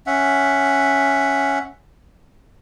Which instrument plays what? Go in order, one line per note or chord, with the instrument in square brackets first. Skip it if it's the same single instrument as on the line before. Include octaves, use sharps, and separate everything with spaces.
[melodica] C#4 E5 F#5